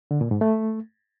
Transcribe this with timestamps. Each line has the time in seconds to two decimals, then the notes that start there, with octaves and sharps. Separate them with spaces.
0.11 D3
0.21 A#2
0.31 G#2
0.41 A3